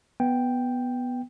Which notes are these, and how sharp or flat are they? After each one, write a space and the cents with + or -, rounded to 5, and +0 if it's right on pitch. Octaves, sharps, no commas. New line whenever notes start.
B3 +0 G5 +0